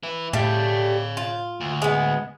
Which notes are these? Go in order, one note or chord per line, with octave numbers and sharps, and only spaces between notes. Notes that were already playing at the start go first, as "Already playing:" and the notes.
E4 B4
A2 G3 A3 C#5 F5
F4
D2
G#3 B3